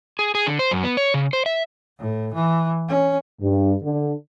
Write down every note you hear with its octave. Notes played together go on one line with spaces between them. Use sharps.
G#4
G#4
D3
C5
F#2
B3
C#5
C#3
C5
E5
A2
E3
C#4
G2
D3